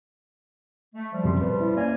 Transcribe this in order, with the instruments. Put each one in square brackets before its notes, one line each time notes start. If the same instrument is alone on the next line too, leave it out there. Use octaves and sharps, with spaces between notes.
[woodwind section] A3
F3 G3
[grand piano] F#2 C3 C6
B4
E4
[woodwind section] A#3 C#4 G#5 [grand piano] D5